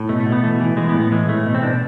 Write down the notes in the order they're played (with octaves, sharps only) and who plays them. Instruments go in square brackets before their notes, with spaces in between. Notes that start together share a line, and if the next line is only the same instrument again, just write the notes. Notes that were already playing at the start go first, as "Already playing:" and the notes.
Already playing: [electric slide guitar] A2
B2 A3
A3
B2
B3
E3 A3
E3
E3 G#3
B3
A2
B3
E3 G#3
A2 A3
B2
C4
B2 D4